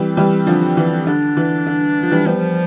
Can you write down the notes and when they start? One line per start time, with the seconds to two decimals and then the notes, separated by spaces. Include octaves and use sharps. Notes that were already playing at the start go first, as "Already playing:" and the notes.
Already playing: E3 G3 C4
0.17 E3 G3
0.47 D3 F3
0.77 E3
1.07 D3 D4
1.37 E3
1.67 D3
2.03 F3
2.12 E3 G3
2.26 F3 G3 B3